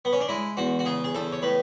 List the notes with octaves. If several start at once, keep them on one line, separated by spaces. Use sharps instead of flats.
B3
C#4
D4
G#3 E4
E2 F#4
F#4
C#3 G#4
G#4
E2 A4
C#5
A2 B4